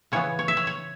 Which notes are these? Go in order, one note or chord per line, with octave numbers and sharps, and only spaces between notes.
C#3 E3 B3 C#5
C#5
E5
C#5
C#5